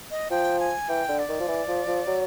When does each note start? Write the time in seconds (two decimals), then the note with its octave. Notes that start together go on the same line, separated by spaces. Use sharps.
0.11 D#5
0.30 F3 G5
0.60 G#5
0.89 E3 G5
1.09 D3
1.19 D5
1.29 D#3
1.40 F3
1.48 E3
1.68 F3
1.87 F3
2.07 F#3